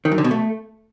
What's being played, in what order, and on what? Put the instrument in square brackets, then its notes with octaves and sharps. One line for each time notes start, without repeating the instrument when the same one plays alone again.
[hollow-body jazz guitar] D#3
F#2
D3
B2
A3